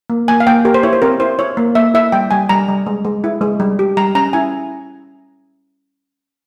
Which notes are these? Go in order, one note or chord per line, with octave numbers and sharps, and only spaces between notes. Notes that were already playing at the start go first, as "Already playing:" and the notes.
A#3
A#3 G#5
F5
A#3 G5
G4 A#4
C5
E4 C#5
C5
C4 A#4
E4 C5
E4 C#5
A#3
A#3 E5
E4 E5
G3 G5
G3 G#5
G3 A#5
G3
G#3
G#3
E4
G#3
G3
G4
G3 A#5
C#4 A#5
E4 G#5